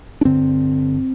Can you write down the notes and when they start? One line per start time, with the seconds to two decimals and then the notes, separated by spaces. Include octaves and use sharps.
0.21 D4
0.25 G2 D3 C4